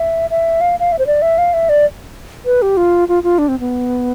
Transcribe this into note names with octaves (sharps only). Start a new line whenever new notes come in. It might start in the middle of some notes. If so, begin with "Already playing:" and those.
Already playing: E5
E5
F5
F5
E5
C5
D5
E5
F5
E5
D5
B4
G4
F4
F4
F4
D4
C4
B3